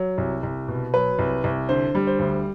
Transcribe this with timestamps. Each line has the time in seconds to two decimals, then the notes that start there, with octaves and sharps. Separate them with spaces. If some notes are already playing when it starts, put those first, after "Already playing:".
Already playing: F#3
0.18 C2
0.43 C2
0.68 B2
0.94 F#3 B4
1.19 C2
1.44 C2
1.69 D3 C5
1.95 G3
2.07 C5
2.19 D2